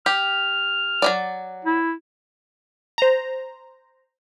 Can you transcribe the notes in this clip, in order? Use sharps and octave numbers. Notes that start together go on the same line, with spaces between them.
G4 F6
F#3 C#4 D5
E4
C5 A#5